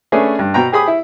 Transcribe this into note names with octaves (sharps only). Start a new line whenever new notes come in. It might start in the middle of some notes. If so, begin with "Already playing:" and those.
A3 C#4 D4 G#4 B4
G2
B2 G5 A#5
G4 G#4 B5 D#6
E4